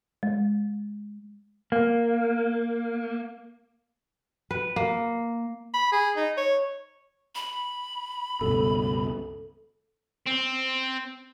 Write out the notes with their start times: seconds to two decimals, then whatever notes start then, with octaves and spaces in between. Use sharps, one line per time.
0.23 G#3
1.72 A#3
4.51 B4
4.76 A#3
5.74 B5
5.92 G#4
6.16 D#4
6.37 C#5
7.35 B5
8.41 C#2 G2 B2 A4
10.26 C4